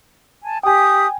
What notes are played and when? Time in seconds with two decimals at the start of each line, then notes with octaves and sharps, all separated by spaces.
0.44 G#5 A5
0.63 G4 G5 G#5 D#6